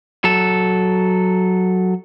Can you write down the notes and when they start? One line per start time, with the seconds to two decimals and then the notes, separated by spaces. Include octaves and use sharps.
0.24 F#3 A4